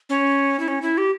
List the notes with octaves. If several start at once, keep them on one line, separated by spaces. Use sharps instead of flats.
C#4
E4
C#4
E4
G4